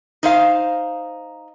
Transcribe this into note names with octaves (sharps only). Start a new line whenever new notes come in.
D#4 C5 F5